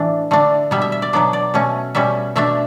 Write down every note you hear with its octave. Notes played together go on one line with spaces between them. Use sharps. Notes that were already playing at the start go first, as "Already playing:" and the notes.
Already playing: A2 E3 A3 D4 D5
D3 A3 D4
B2 G3 B3 E5
E5
E5
D5
B2 F#3 B3 D4 D5
D5
B2 A3 C#4
B2 G3 C#4 E5
B2 A3 D4 E5